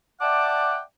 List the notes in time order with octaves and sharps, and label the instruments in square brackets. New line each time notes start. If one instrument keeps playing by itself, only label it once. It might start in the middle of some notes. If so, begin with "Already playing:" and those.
[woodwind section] D5 E5 F#5 G5 A5 D6